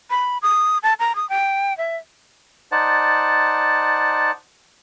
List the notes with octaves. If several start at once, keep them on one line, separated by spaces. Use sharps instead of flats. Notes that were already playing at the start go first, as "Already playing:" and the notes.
B5
D#6
A5
A#5
D#6
G5
E5
D#4 C5 D5 F#5 A5